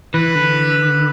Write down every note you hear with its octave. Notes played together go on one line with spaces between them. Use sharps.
E3 B4
D3